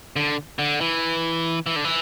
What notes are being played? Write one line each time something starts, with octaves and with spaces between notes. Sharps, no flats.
D3
D3
E3
E3
D3
E3